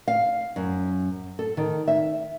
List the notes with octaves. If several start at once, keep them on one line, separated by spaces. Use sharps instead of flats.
F5
F#2
A4
D#3
E5